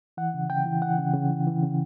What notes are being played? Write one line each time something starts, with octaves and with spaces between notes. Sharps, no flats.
E3 F#5
C#3
C#3 G5
E3
E3 F#5
C#3
C#3
E3
E3
C#3